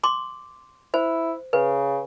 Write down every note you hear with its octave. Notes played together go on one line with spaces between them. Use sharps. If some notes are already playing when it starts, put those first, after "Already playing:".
C6 D6
E4 C5
C#3 B4